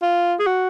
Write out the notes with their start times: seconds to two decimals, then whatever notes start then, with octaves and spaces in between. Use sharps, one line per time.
0.02 F4
0.39 G#4
0.47 F#4